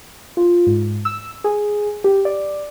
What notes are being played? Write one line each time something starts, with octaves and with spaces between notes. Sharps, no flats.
F4
G#2
E6
G#4
G4
D5